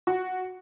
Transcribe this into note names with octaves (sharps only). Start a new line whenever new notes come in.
F#4